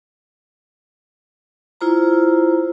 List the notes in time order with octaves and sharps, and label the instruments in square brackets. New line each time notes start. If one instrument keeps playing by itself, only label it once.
[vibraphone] E4 F4 C5 A#5